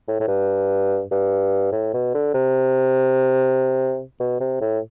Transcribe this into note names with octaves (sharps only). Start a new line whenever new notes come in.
A2
A2
G2
G2
A2
B2
D3
C3
B2
C3
A2